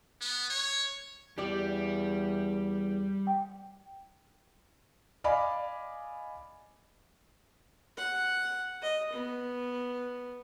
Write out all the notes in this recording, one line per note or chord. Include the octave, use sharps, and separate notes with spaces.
B3
C#5
E2 G3 G4 D5
G5
D5 D#5 F5 G#5 B5 D6
F#5
D#5
B3